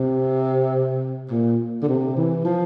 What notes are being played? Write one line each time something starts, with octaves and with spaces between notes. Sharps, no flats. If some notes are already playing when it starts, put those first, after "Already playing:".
Already playing: C3
A#2
D3
C3
E3
F3